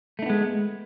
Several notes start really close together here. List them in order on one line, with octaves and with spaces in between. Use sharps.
A3 D#4 B3 G#3